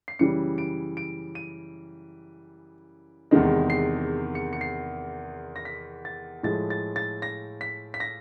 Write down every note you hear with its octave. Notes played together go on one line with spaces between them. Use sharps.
C7
F#2 C#3 E3 G3 C#7
D7
D7
D#7
E2 C3 D#3 G#3
C7
C#7
C#7
C7
A#6
B6
A6
A2 F3 G#3 A6
A6
A6
A#6
B6
B6
A#6